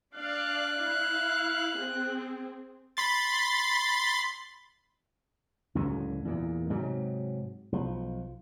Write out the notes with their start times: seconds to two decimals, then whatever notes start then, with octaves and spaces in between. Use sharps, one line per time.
0.15 D4 D5 F5 F#6
0.79 E4 F5
1.78 C4 G#4
2.97 B5 C6 A6
5.75 C#2 F#2 A2 D3
6.25 E2 A#2
6.70 G#2 C3 F#3
7.72 B1 F3